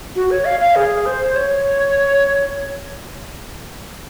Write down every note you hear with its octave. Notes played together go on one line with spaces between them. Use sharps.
F#4
C#5
F5
F5
G#4
C5
C#5